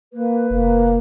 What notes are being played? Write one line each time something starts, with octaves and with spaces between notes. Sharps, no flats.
A#3 B4
F1 A#3